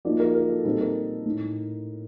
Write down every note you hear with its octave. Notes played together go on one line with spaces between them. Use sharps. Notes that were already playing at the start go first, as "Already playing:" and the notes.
F3 A#3 D#4 D5
A#4
A#4
A4
A#2 G3 C4 D#4 A4
A#4
A2 A3 D#4